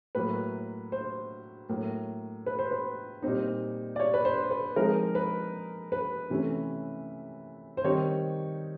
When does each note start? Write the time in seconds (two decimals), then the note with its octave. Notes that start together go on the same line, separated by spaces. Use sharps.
0.15 A2 F#3 A#3 B4
0.92 C5
1.69 A2 F#3 A#3
2.46 B4
2.59 C5
2.71 B4
3.22 A#2 G3 C4 D#4
3.96 D5
4.00 C#5
4.14 B4
4.25 C5
4.51 B4
4.76 F3 G#3 C4 D#4 A#4
5.15 B4
5.92 B4
6.30 C3 E3 A3 C#4
7.77 C5
7.84 D#3 G3 C4 D#4 C#5